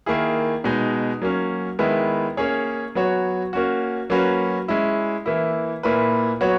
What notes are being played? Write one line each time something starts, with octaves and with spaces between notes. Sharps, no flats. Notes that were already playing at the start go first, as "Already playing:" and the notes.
D#3 A#3 E4 G#4
B2 G#3 D#4
F#3 A#3 C#4
D#3 G#3 B3 E4
A#3 C#4 G#4 C#5
F#3 B3 F#4 C#5
A#3 C#4 F#4
F#3 A#3 C#4 F#4 B4
G#3 C#4 E4
E3 A#3 E4
A#2 A#3 E4 B4
F#3 B3 F#4 C#5